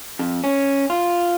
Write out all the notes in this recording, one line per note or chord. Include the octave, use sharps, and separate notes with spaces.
F2
C#4
F4